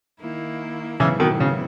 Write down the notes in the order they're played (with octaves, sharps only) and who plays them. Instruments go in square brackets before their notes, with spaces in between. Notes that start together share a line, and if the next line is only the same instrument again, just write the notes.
[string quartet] D#3 A#3 E4
[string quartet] G#2 F#3 B3 E4 [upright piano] C#3 E3
[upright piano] B2 D#3
C#3